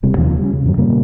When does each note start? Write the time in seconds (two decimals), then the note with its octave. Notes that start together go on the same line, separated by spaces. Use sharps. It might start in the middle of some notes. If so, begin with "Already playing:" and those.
0.03 D1 C3 G3
0.18 D#2 C#3 F3
0.39 G3 C#4
0.53 C#3
0.65 F2 G#2 D3 F#3
0.78 A#2 C#3 G3 A#3